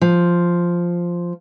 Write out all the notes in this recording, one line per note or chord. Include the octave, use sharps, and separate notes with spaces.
F3